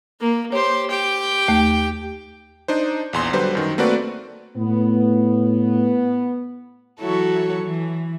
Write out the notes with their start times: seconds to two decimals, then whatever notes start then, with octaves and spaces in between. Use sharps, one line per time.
0.21 A#3
0.52 G4 C5 C#5
0.90 G4 G5
1.48 D#2 A3
2.68 D4 D#4 C5
3.13 A#1 E2 C6
3.33 D3 F#3 G3 B4 C5
3.55 F#2 D#3
3.78 A3 A#3 C4 F#4 B4 D5
4.57 A2 B3
7.00 E3 F#3 E4 F#4 A4 C#5
7.62 E3